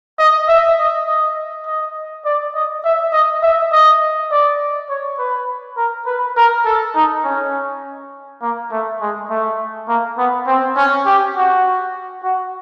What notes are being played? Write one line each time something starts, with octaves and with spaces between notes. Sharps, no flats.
D#5
E5
D#5
D#5
D#5
D5
D#5
E5
D#5
E5
D#5
D5
C#5
B4
A#4
B4
A#4
A4
D#4
C#4
A#3
A3
G#3
A3
A#3
B3
C4
C#4
G4
F#4
F#4